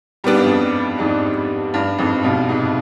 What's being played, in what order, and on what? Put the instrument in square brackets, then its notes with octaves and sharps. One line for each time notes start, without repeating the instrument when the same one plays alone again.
[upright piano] G#2 [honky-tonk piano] G3 B3 D4
[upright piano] G2
F2 G#2
F2 G#2
G2
F2 G#2
G2 B2
G#2 C3